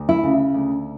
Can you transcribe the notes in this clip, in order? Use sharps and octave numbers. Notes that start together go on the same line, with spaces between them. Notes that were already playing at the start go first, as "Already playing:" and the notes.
Already playing: D2
E4
C#3
D2